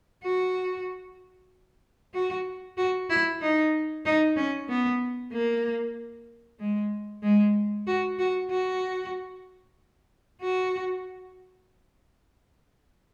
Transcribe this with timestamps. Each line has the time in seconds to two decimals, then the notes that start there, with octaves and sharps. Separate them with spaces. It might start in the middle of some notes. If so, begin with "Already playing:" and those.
0.23 F#4
2.14 F#4
2.77 F#4
3.10 E4
3.41 D#4
4.05 D#4
4.36 C#4
4.69 B3
5.33 A#3
6.60 G#3
7.23 G#3
7.87 F#4
8.19 F#4
8.50 F#4
10.42 F#4